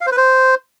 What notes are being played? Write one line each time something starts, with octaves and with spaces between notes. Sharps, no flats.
F5
C5
B4
C5